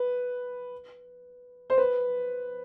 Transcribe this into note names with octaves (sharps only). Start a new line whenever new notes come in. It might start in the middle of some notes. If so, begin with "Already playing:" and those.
Already playing: B4
C5
B4